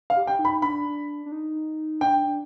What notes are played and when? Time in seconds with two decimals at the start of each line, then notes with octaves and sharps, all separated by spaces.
0.10 F5
0.16 G4
0.27 G5
0.39 D#4
0.45 B5
0.62 D4 B5
1.26 D4
1.32 D#4
2.01 D4 G5